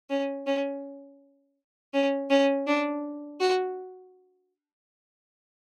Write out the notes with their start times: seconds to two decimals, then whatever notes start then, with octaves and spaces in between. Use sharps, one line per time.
0.10 C#4
0.47 C#4
1.94 C#4
2.30 C#4
2.67 D4
3.40 F#4